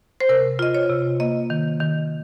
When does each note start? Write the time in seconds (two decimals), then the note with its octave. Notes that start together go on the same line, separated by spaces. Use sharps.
0.20 C5
0.29 C3 A#4
0.59 F4 D#5
0.75 C#5
0.89 C3
1.20 A#3 D#5
1.50 D#3
1.80 D#3